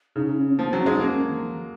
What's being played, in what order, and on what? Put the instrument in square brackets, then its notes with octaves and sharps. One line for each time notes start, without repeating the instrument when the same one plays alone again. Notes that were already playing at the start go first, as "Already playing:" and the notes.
[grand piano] C#3 [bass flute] D#4
[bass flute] D#4
C#4
C#4
[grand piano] F3 [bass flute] A#3
[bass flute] B3
[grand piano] F#3
[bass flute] C#4
[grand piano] G#3 [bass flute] D#4
[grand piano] A#3 [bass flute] C#4
[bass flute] C#4
D#3
F3